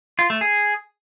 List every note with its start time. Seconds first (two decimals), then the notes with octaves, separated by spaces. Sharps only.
0.19 F4
0.30 A3
0.41 G#4